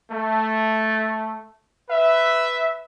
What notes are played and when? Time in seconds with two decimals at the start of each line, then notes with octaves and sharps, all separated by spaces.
0.11 A3
1.90 B4 E5